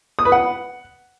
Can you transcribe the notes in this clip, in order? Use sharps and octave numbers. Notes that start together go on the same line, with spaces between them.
D#6
B4
F#5